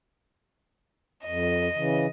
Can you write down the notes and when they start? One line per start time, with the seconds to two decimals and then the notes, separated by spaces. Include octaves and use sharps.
1.26 F2 D#5
1.75 C#3 E3